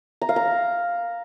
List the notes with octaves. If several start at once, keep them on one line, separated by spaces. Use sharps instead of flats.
A#5
F5
A#5